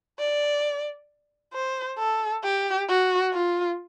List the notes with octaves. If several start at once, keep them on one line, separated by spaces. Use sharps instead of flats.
D5
C5
A4
G4
F#4
F4